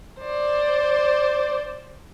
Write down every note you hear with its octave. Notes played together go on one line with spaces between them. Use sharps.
C5 D5